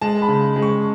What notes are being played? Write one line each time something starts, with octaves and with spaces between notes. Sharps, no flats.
G#3 A5
B5
C#3
G#3
C#6